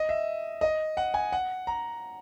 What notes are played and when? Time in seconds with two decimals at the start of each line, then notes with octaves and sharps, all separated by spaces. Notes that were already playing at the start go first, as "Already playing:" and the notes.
Already playing: D#5
0.09 E5
0.61 D#5
0.97 F#5
1.14 G#5
1.32 F#5
1.67 A#5